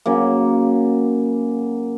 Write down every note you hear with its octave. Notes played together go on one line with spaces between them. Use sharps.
C#3 F#3 A#3